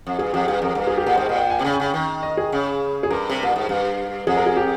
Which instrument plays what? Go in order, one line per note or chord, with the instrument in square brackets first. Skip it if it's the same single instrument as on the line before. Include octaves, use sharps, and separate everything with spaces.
[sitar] F2
[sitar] G2 [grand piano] G#4
[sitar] F2 [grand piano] G4
[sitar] G2 [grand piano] G#4
[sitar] F2 [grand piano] A#4
[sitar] G2 [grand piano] A#4
[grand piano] G#4
G4
[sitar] A#2 [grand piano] A#4
[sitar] G#2 [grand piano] C5
[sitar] A#2 [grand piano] D#5
[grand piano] G5
G#5
[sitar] C3
[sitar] C#3 [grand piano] G5
[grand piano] G#5
[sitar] C#3 [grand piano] G5
[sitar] D#3
[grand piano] D#5
G#4
[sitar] C#3
[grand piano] G#4
[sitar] G2 [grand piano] A#4
[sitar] C3
A#2
G#2
G2
[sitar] F2 [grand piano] G#4
[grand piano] A#4
G#4
G4